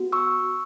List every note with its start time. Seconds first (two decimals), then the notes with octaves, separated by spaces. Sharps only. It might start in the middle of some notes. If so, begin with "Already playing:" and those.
Already playing: B3 F#4
0.12 C#6 E6